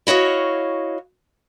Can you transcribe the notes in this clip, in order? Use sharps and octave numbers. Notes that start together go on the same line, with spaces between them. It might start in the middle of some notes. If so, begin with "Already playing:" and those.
E4 F#4 C#5 D#5 F5